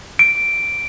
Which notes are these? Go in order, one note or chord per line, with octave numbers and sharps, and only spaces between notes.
D7